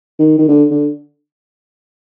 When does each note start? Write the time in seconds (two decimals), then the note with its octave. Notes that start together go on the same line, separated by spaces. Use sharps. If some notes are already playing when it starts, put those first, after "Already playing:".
0.19 D#3
0.38 D#3
0.48 D3
0.71 D3